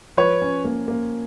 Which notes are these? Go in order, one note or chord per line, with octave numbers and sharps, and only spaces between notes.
F3 B4 C#5
C#4
A#3
A#3